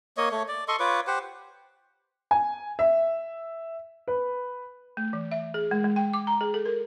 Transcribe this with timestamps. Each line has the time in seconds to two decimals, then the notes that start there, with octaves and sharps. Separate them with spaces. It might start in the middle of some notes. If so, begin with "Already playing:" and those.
0.17 A#3 C#5 D#5
0.31 A3 C#5
0.48 D5
0.68 A4 D#5 C6 C#6
0.80 F4 B4 C#5 D6
1.07 G4 C5 F#5
2.31 G#5
2.79 E5
4.08 B4
4.97 A3
5.13 E3
5.32 E5
5.54 G#4
5.71 G#3
5.84 G#3
5.96 G5
6.13 D6
6.27 A#5
6.41 G#4
6.54 A4
6.66 A#4